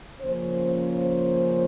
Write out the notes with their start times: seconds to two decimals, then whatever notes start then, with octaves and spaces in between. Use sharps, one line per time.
0.19 C#3 F3 A#3 C#4 C5
0.94 C5